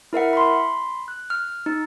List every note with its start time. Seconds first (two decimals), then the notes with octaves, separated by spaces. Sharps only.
0.13 E4 A#4 E5 F#5
0.33 B5 C6
1.08 F#6
1.30 F6
1.66 D#4